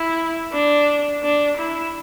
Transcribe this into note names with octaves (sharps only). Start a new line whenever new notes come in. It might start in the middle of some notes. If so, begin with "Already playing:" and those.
Already playing: E4
D4
D4
E4